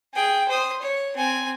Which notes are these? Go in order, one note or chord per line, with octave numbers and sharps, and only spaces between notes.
G#4 G5
C5 D#6
C#5
C4 G#5